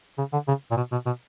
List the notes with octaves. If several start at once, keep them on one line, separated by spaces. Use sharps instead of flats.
C#3
D3
C#3
A#2
B2
B2
B2